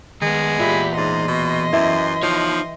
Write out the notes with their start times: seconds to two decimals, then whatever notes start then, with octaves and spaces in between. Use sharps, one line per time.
0.22 D#3 G#3 B3
0.59 E2 A#2 G4 E5 B5
0.97 G#2 D#5 C6
1.28 B2
1.73 F#2 E3
2.23 F3 D#4 C#5 G5